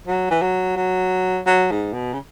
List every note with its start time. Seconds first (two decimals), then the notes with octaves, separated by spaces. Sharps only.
0.07 F#3
0.31 E3
0.42 F#3
0.76 F#3
1.47 F#3
1.71 G#2
1.93 B2
2.13 C#3